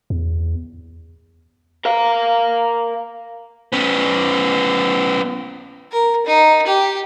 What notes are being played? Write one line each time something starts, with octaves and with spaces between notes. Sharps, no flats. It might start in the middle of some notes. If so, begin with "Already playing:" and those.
E2
A#4 F5
B3 C#4
A#4
D#4
G4